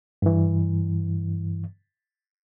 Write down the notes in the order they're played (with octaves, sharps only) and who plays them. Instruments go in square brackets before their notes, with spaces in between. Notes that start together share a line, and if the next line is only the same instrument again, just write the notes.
[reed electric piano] G2 E3